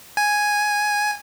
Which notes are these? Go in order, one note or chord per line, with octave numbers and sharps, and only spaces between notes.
G#5